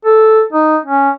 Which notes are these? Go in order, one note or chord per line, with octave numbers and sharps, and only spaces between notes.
A4
D#4
C#4